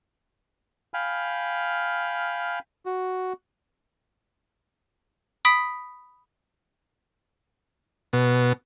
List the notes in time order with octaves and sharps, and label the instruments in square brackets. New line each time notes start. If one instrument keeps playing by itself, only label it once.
[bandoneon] F5 G5 G#5 B5 F6
[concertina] F#4
[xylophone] B5 D#6 B6 D7
[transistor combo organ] B2